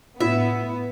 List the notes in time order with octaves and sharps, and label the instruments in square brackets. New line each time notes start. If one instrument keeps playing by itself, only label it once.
[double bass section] A2 [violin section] B3 [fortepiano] E4 [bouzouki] E5